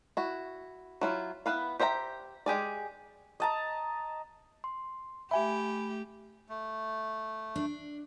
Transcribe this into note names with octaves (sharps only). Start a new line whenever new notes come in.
E4 F#4
F#3 E4 F4
B3 E4 B4 F5
G4 C5 E5 F#5 A#5
G#3 G4 G#4 D5
D#5 A5 A#5
C6
A3 G4 E5 G#5 B5
A3
D4